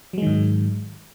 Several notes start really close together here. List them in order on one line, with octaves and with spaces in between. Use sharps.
F#3 G#3 D#3 G#2